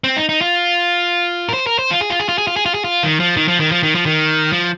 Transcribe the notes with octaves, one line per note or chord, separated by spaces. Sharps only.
C4
D#4
D#4
F4
A#4
C5
A#4
C5
F4
G#4
F4
G#4
F4
G#4
F4
G#4
F4
G#4
F4
D#3
F3
D#3
F3
D#3
F3
D#3
F3
D#3
F3